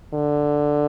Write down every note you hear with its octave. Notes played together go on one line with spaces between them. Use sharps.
D3